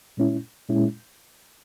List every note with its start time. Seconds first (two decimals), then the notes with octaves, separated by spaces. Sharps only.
0.17 A#2 G#3 C#4 E4
0.69 A#2 G#3 C#4 E4